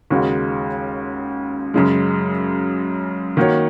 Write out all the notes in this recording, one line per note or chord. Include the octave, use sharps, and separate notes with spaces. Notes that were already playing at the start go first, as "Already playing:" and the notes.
D#2 C#3 G#3 F#4
F#2 C#3 G#3
D#3 A#3 F#4 C#5